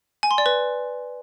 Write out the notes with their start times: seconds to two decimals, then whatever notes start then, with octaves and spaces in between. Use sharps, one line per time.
0.23 G#5
0.31 C6
0.38 D5
0.46 B4